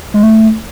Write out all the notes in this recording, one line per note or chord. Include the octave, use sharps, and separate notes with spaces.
G#3
A3